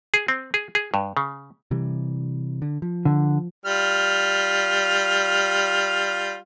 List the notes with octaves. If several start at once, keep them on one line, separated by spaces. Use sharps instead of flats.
G#4
C4
G#4
G#4
G2
C#3
C3 E3 G3
D3
F3
D3
G3 F4 F6